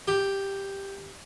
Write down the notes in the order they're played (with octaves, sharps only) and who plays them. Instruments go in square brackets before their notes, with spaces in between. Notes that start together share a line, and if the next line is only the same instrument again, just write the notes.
[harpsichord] G4